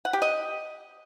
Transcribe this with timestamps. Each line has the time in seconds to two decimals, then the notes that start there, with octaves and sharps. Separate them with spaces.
0.05 F#5
0.13 G4
0.22 D#5